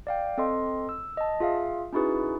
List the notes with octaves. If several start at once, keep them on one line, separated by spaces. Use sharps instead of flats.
D5 F5 G5
C4 A4 D#5 C6
E6
D#5 A5
F4 G#4 E5 F5
C#4 D#4 E4 F#4 G#4 B4